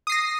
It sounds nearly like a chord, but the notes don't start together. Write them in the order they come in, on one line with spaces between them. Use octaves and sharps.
D#6 C7 A#6